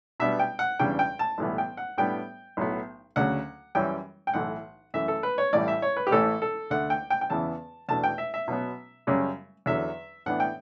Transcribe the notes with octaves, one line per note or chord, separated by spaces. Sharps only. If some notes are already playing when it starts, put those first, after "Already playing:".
B2 G3 B3 D4 E5
G5
F#5
E2 C#3 G3 D4 G5
G5
A5
B1 A2 E3 G3 B3
G5
F#5
A2 G3 B3 D4 G5
B1 A2 F#3 B3
D2 C#3 F#3 F#5
F#2 E3 G3 C#4 G5
G5
B1 A2 E3 F#5
F#2 E3 A3 E5
A4
B4
C#5
A1 A2 E3 G3 D5
E5
C#5
B4
G4
A1 A2 E3 A3 C#4 A4
A4
D2 D3 A3 F#5
G5
G5
G5
E2 C#3 E3 B3 A5
E2 B2 A3 D4 A5
G5
E5
E5
B2 F#3 B3
F#2 C#3 G3 C#4
E2 D3 F#3 E5
A2 E3 B3 D4 F#5
G5